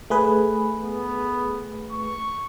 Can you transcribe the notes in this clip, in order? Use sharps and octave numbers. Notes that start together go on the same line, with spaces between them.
A3 G#4 B4
B3
C#6